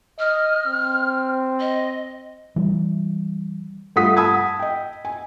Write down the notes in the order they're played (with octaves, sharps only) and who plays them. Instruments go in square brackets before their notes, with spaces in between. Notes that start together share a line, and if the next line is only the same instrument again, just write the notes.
[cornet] D#5 [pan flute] F6
[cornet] C4
[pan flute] D#5
[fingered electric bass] E3 G3
[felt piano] G2 A3 F4 F#5 D#6 B6
F#5 A5 B5 D#6 E6 G#6
D#5 G5
G#5